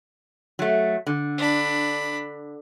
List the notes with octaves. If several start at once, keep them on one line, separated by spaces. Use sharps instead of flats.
F#3 A3
D3
D4 B5